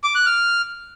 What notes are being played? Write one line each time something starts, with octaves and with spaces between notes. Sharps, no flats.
D6
F#6
F6